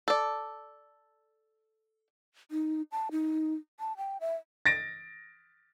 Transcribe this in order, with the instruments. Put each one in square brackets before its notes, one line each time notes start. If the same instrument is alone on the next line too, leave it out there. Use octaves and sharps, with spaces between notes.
[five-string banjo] A4 D5
[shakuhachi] D#4
A5
D#4
A5
G5
E5
[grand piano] A6 A#6 D7